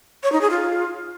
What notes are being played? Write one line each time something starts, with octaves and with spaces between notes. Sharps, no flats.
C#5
D#4
G#4
F4